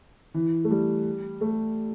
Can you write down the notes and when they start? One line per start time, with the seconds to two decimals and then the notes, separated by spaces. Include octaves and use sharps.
0.34 E3
0.64 A3
0.71 G3
1.41 A3